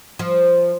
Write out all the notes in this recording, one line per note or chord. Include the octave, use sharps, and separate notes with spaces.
F3